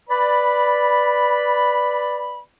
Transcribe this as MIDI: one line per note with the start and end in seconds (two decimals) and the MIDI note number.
0.09 2.41 71
0.09 2.41 74
0.09 2.41 83